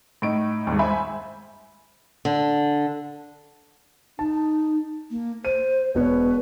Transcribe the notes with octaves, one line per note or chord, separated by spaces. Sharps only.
A2 D#4 D7
D#2 G#2
C5 E5 G#5 B5
D3
D#4 A5
A#3
C5 D#7
E1 B2 B4 C#5